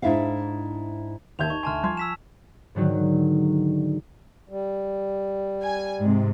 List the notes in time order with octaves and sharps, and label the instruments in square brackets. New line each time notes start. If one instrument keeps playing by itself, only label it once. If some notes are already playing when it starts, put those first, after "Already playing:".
[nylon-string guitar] G#2 D4 E4 E5 F5
[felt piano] D#2 E5 G6 [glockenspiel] A5 G#6 F7
[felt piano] D#4 [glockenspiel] C#6
[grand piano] D2 E5 C6 [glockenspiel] G#5 A5 F6
[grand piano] F3 [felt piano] C6 G#6
[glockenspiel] E6 B6 E7
[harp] G#2 D3 D#3 F#3
[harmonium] G3
[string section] G#5
G#2 C3